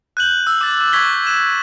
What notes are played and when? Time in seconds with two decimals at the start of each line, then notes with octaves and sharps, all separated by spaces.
0.17 F#6 G6 F#7
0.47 E6
0.61 D6 A6
0.81 D6
0.93 C#6 G#6 B6 G7
1.26 F#6 E7